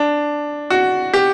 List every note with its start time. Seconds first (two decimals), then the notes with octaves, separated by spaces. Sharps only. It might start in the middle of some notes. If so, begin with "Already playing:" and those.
Already playing: D4
0.70 F#4
1.13 G4